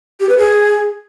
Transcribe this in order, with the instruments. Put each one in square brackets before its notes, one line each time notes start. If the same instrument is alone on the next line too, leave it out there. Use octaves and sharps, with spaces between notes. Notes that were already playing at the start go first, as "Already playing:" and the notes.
[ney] G4
B4
G#4